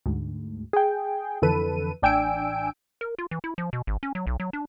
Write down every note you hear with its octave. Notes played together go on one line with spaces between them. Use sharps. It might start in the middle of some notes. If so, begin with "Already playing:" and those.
D2 G#2
G#4 G5
F2 D3 E3 A4 B4 D#7
A1 D4 G5 G#5 E6 D7
A#4
F4
E3
E4
F3
B2
G#1
C#4
F#3
B1
F#3
D4